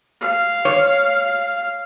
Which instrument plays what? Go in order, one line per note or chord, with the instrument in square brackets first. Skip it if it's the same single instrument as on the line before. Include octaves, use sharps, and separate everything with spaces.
[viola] F5
[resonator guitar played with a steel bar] C#5